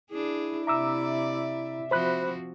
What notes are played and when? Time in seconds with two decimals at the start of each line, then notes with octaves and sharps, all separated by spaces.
0.11 D4 E4 G#4
0.67 C3 D5 E5 A#5 D6 E6
1.91 F3 C4 F#4 C5 B5 F#6